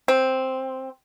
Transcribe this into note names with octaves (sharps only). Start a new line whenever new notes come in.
C4